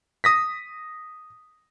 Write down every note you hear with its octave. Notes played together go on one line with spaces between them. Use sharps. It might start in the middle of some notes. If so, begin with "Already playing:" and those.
D#6 A#6 B6